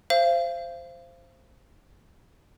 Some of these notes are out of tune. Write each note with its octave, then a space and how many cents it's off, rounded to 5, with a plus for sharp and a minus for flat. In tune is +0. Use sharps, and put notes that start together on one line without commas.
C5 +0 F5 -35